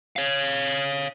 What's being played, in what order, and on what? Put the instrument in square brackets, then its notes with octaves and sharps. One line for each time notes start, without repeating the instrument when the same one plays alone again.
[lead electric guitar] C#5 F5